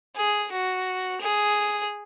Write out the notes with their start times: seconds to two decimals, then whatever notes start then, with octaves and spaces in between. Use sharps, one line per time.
0.16 G#4
0.52 F#4
1.21 G#4